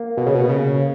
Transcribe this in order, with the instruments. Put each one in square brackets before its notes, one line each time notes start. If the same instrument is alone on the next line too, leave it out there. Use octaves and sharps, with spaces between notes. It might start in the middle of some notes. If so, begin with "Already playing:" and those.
Already playing: [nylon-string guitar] A#3
[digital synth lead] B2
C#3
B2
C#3